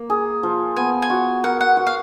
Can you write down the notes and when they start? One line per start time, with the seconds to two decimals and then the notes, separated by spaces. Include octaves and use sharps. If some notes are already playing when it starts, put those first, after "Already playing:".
Already playing: A#3
0.10 G#4
0.43 F3
0.76 B3 G#5
1.02 G#5
1.10 F#4
1.44 A#4 F#5
1.61 F#5
1.77 F#4
1.87 F5